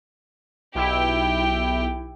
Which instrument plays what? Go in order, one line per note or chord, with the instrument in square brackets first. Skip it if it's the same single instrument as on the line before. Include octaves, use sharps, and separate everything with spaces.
[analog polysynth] B1 E4 [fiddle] G4 G5